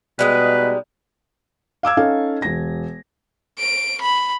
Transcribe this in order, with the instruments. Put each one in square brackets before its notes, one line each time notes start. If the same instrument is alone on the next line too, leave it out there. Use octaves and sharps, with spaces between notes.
[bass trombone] B2 [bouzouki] G3 G#3 D#4 [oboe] B4
[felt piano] F5 D6 E6 G#6
C#4 D#4 A4 F5
E1 A#6
[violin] D7
B5